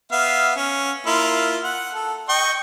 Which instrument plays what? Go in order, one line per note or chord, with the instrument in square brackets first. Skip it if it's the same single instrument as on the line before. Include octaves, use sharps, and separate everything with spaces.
[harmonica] B3 E5 F5
C#4
A#3 E4 F4
F#5
A4
D#5 G5 C#6